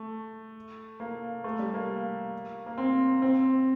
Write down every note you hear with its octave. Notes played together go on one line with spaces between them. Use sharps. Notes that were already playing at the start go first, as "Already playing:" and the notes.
Already playing: A3
A#3
A3
G3
A#3
A#3
C4
C4